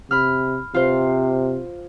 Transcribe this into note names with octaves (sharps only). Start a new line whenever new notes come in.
C3 B5 F6
C3 F4 C5